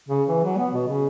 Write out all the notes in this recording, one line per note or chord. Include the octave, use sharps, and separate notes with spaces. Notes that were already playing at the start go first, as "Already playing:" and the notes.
C#3
E3
F#3
B3
B2
C#3